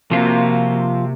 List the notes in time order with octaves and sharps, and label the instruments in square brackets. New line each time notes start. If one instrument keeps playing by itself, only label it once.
[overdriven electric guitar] C3 [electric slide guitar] F3 F4 [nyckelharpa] A#3 F#4